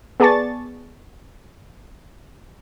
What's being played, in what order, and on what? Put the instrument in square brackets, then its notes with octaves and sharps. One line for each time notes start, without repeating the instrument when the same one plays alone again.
[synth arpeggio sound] B3 G#4 D5 A5 C#6 A6